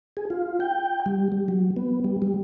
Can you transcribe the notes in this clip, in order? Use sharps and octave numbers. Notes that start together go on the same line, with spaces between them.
G#4
F4
G5
G3
G3
F#3
B3
G3
G3